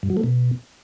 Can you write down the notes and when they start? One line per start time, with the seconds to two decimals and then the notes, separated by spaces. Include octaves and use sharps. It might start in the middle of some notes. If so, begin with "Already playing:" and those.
0.03 G2
0.10 F#3
0.17 A3
0.24 B2